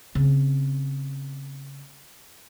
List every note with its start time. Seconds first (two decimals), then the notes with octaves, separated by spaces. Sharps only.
0.15 C#3 C4